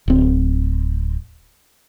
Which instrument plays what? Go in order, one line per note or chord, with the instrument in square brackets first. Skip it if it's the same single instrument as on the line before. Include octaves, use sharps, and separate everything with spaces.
[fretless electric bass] D1 C4